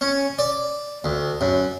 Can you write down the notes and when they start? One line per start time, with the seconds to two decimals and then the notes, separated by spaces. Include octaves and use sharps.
0.01 C#4
0.39 D5
1.04 D2
1.41 F#2